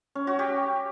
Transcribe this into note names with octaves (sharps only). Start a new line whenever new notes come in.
C#4
F#4
G4